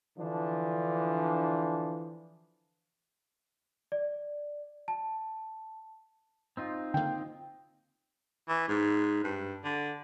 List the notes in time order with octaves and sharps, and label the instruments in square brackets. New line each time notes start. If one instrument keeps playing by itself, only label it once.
[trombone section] D3 E3 F3 D4
[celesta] D5
A5
[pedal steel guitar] C4 D#4 F4
[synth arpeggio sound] D3 A#3 [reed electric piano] G5
[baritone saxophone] E3
G#2
G2
D3